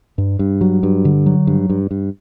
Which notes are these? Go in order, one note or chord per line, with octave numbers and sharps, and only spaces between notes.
G2
G2
F#3
G2
D3
F#3
G2
G2
G2